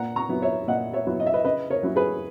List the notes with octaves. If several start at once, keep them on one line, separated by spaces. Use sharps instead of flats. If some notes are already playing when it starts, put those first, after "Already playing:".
Already playing: A#2 F#5 A#5
A#5 C#6
F#3 B3 E4
C#5 E5
A#2 D#5 F#5
C#5 E5
F#3 B3 E4
D#5
E5
B4 D#5
C#3 B4 D#5
A#4 C#5
F#3 C#4 E4
G#4 B4